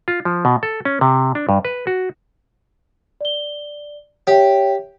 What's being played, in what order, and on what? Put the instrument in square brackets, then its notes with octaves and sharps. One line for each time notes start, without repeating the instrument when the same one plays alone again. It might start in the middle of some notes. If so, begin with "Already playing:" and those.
[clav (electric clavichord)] F4
F3
B2
A4
C#4
C3
D4
G2
B4
F#4
[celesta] D5 G7
[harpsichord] G4 [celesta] C#5 E5 G5